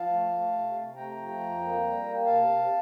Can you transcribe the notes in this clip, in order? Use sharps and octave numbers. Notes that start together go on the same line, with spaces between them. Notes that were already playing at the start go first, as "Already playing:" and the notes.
Already playing: F3 F5 A5
A3
A3
C3
C3
A3 G5 A#5
F3
F2
A#3
G3
A#3
C3 F5 A5
C3